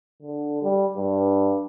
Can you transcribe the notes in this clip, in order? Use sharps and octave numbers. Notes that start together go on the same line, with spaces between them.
D3
G3
G2